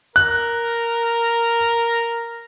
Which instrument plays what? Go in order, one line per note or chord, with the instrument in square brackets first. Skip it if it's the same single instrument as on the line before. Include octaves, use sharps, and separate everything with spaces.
[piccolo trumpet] A#4 [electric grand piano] F#6